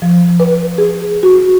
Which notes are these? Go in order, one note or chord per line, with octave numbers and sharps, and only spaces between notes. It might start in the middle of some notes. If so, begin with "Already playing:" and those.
F3
B4
G#4
F#4